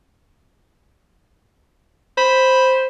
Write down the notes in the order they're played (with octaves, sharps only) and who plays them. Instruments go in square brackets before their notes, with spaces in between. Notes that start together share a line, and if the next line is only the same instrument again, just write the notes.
[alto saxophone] C5 [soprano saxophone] B5